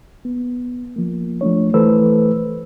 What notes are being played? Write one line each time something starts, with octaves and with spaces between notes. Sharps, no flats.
B3
F3 A#3
F3 A3 D4 C#5
E3 A3 A4 B4 C5 E6